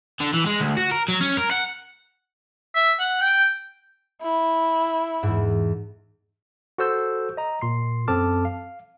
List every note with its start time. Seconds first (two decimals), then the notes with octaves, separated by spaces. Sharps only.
0.21 D3
0.34 E3
0.47 G#3
0.61 D2
0.77 F#4
0.91 A#4
1.08 F#3
1.21 C#4
1.37 A#4
1.51 F#5
2.75 E5
2.99 F#5
3.21 G5
4.21 E4
5.23 E2 G#2
6.78 F#4 A4 C5 E6 G6
7.37 D#5 A#5
7.61 A#2 C6 C7
8.08 F#2 C4 A4 A5 D6 F6
8.45 F5